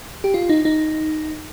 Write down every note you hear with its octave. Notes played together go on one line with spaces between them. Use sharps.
G4
F4
D#4
D#4